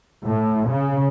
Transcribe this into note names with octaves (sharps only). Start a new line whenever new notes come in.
A2
C#3